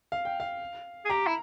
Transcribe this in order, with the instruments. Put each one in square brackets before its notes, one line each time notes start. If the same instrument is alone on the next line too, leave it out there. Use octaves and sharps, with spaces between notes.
[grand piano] F5
G5
F5
[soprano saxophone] G#4
[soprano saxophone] G4 [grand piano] A#5
[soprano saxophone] E4